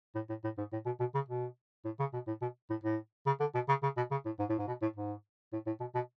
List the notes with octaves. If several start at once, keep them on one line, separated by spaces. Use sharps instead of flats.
A2
A2
A2
G#2
A2
B2
B2
C#3
B2
A2
C#3
B2
A2
B2
A2
A2
C#3
D3
B2
C#3
C#3
B2
C#3
A2
G#2
A2
G#2
B2
A2
G#2
A2
A2
B2
B2